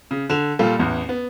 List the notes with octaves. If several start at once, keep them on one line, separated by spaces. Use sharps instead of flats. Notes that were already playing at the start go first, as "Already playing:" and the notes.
C#3
D3 E7 F7
A#2 G3 F4 A4
A1 E2
B3